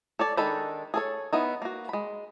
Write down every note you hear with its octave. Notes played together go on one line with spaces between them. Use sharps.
A4 C#5 D5
D#3 G#3 D4 A4 B5
G#4 A4 C#5
B3 D#4 E4
A#3 F#4
G#3 B5